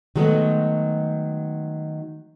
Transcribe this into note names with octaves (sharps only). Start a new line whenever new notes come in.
D#3 F#3 G#3 A3 B3